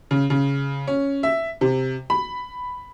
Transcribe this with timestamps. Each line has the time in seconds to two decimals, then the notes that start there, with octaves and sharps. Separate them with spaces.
0.11 C#3
0.30 C#3
0.87 C#4
1.23 E5
1.61 C3
2.10 B5